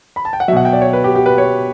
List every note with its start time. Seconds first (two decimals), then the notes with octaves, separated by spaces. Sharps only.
0.16 B5
0.25 A5
0.33 G5
0.40 F#5
0.48 F#3 E5
0.52 B2 F#5
0.65 G5
0.73 D5
0.82 C#5
0.93 B4
1.04 G4
1.15 G4
1.26 B4
1.38 C#5